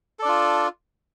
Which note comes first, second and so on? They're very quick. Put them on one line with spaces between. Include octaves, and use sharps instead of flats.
A4 D5 D4 F4